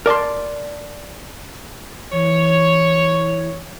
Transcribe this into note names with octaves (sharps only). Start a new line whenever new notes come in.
A#4 D5 A5 C6
E3 C#5